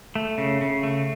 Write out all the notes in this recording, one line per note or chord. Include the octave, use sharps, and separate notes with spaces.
A3
C#3
C#3
A3